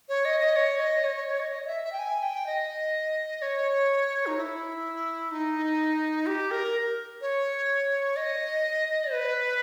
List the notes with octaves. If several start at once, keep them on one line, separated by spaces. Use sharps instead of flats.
C#5
D#5
D#5
C#5
D#5
C#5
C#5
C#5
D#5
D#5
D#5
E5
E5
G5
G#5
G5
D#5
C#5
D#4
E4
D#4
G4
A#4
C#5
D#5
B4